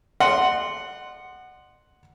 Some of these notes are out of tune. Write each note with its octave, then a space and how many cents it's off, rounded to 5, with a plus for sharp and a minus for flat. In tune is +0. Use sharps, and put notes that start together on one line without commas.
D#5 -45 F#5 +0 C6 +0